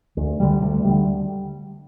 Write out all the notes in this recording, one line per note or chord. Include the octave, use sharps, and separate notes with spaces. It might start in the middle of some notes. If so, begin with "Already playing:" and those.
D2
D3 G3
D2
D3 G3